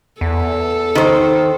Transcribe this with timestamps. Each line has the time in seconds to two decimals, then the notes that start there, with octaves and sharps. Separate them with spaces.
0.21 E2 A4
0.95 D#3 C5